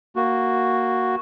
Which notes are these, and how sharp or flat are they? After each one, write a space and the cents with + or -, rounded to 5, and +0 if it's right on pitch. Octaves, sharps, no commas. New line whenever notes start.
A#3 +0 F#4 +0